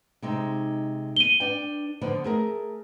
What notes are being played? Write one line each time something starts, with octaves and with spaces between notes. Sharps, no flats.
C3 G#3 D#4
D#7 G7
D4 B4 G5
D3 F3 B3
A3 G#4 A#4